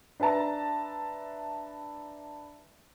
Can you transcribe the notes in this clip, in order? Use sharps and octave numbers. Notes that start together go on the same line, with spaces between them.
D4 B4 E5 A5 A#5